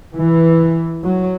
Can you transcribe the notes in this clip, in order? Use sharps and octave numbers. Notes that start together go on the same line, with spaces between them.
E3
F#3